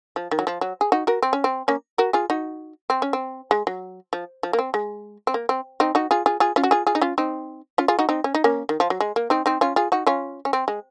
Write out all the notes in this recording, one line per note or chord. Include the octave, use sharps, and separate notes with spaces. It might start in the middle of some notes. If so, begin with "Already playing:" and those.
F3
D#3
F#3
F3
F#3
G#4
D#4 F#4
F#4 A#4
C4
C#4
C4
A#3 C#4
F#4 A#4
F4 G#4
D#4 F#4
C4
C#4
C4
G#3
F#3
F3
F3
A#3
C4
G#3
C4
A#3
C4
C4 D#4
D#4 F#4
F4 G#4
F4 G#4
F4 G#4
C#4 F4
F#4
F4 G#4
F4 G#4
D#4
C#4 F4
C4 D#4
C#4 F4
F4 G#4
D#4 F#4
C4 D#4
C#4
D#4
A#3 C#4
D#3
F3
F#3
G#3
A#3
C4 D#4
C4 D#4
C#4 F4
F4 G#4
D#4 F#4
C#4 F4
C#4
C4
G#3